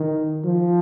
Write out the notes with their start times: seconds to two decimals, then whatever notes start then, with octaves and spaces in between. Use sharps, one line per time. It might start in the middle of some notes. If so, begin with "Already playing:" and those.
Already playing: D#3
0.44 F3